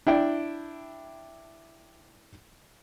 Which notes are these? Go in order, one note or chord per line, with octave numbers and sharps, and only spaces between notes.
D4 E4 G5